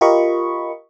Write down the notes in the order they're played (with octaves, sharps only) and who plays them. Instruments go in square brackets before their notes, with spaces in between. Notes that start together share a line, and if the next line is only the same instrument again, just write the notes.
[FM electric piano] F4 G4 A#4 D#5 B5 C#6